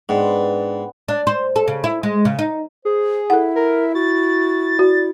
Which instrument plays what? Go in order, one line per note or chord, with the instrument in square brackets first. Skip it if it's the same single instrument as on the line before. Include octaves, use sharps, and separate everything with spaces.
[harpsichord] G#2 [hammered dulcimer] B3 B4 C6 [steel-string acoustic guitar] D4 [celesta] F#5 G5
[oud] D4
C5
A4
C#3
E4
G#3
C#3
D#4
[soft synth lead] G#4 [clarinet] C5
[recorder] E4 [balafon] A4 F#5 [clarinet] E5
[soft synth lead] A#4
[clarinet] F#4 [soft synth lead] A6
[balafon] F#4 [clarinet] D5